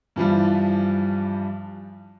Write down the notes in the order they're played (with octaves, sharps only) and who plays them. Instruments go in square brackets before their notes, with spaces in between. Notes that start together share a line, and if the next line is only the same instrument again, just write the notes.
[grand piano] G2 E3 F3 G3